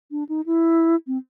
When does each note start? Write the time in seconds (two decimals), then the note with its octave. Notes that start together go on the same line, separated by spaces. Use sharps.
0.11 D4
0.29 D#4
0.46 E4
1.07 C4